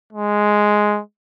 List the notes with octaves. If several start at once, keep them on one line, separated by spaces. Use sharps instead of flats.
G#3